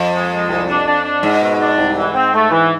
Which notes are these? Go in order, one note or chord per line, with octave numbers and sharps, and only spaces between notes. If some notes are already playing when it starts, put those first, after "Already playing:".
Already playing: F2
G#3
G#3
C2
D4
D4
D4
G#2 G#3
B2
D4
C2
E3
C4
A3
E3